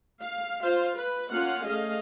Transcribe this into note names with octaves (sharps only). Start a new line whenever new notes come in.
F5
F4 C5 F5
B4
A#3 C#4 F4 F5 F#5
A3 G#4 D#5 F5